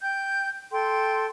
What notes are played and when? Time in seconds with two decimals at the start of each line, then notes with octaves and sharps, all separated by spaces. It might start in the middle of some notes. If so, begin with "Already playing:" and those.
0.03 G5 G6
0.72 A4 G5 C6